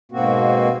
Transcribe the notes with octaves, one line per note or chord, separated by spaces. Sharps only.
G#2 B2 A#3 C4 F#4